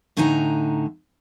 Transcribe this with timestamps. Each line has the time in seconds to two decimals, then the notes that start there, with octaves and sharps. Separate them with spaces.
0.17 A2 D3 A3 D#4 G#5 A#5